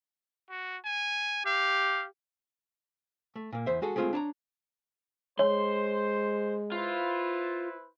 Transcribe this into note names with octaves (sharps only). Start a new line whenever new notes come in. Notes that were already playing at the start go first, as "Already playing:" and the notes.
F#4
G#5
G4 F5
A3
A#2 A#3
E2 C5 E5
G#3 F#4 G#4 A4
G#3 A3 C4 F4 G#4
D4 C#5 A5 A#5
G#3 C5 C#5 C6
E4 F4 B4 C5